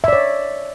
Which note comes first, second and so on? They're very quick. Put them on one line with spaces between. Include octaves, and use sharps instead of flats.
E5 D5 C#5